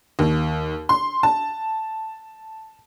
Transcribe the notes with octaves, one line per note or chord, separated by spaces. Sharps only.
D#2
C6
A5